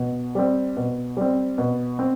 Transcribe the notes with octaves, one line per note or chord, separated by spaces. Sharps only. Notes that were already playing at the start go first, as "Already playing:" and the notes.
Already playing: B2
G3 C4
B2
G3 C4
B2
C4